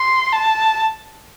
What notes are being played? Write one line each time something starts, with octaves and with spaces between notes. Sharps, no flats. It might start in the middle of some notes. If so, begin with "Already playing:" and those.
Already playing: C6
A5